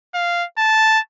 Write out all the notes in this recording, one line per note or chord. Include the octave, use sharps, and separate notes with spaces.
F5
A5